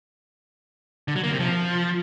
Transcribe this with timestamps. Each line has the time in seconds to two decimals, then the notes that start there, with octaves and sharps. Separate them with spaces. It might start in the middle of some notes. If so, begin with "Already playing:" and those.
1.08 D3
1.16 F#3
1.24 A#3
1.32 C3
1.39 F3